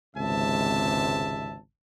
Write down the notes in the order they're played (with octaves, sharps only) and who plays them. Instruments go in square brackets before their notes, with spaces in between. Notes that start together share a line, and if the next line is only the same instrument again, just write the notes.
[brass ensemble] G#1 C#2 C3 E5 A5